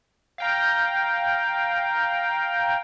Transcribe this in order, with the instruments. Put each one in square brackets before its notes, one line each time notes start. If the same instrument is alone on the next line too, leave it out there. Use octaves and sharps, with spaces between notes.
[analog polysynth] F5 G5 A#5